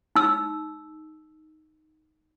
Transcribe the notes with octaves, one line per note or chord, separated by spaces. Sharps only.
D#4 E6